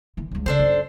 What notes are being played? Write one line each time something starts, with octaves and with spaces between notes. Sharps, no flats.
D3 E3
C#2 G3
C#3 D4 A4 C5
F#2